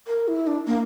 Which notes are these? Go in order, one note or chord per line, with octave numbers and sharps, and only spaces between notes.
A#4
E4
D4
A#3